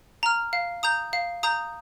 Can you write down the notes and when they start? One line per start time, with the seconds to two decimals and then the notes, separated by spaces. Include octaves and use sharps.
0.23 A#5 F6
0.53 F5
0.83 A#5 D#6 G6
1.13 F5
1.43 A#5 D#6 G6